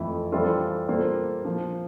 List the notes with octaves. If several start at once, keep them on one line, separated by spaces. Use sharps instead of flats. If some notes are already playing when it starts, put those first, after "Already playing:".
Already playing: F2 E3 A3 E4
E3 G3 C4 F4 A4
G3 A#3 F4 A4 C5
F3 A#3 F4